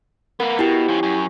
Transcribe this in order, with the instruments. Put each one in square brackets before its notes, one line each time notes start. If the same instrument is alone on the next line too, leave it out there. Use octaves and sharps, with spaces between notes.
[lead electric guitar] A#3 B3 [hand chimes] A#4
[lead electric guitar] B2 [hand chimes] E4 G4 G5
[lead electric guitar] F3 C#4
F#2 C#4